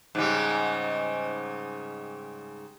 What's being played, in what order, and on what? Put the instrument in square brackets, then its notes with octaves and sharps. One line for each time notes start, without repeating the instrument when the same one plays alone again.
[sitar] G#2 C#3 G3